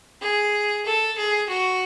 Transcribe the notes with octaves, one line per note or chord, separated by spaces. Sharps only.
G#4
A4
G#4
F#4